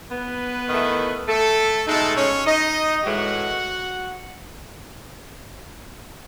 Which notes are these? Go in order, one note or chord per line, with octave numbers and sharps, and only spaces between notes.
B3 B4
D#3 A3 E4
A3 A4
B2 G#3 A3 D#4 A4
C#4 C#5
D#4 D#5
A2 E3 G#3 F#4 F#5